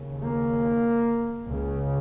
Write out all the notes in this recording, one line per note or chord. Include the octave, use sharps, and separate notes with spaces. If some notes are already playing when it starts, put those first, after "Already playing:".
Already playing: D#2 C#3
A#3
C#2 C#3